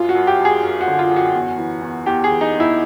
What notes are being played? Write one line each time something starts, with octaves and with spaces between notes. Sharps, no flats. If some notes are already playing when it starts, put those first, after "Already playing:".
Already playing: F#2 F4
F#4
F#2
G4
F#2
G#4
F#2
F#4
D3
F4
F#2
F#4
E2
E3
E2
E2 G4
G#4
E3
D#4
E2
E4